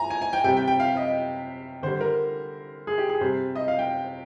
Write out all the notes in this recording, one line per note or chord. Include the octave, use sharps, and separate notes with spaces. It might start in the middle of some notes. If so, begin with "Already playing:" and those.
Already playing: G#5 A#5
G#5
G#5
G5
C3 G3 G5
G5
G5
F5
D#5
D3 G3 C5
A#4
G#4
G4
G#4
C3 G3 C5
D#5
F5
G5